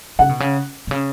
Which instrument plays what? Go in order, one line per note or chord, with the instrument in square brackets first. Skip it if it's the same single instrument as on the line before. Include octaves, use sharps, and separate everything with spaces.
[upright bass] C#3 [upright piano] F#5
[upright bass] B2
C#3
B2
C#3